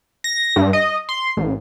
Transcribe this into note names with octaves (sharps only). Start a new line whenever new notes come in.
A#6
G2
D#5
C6
A1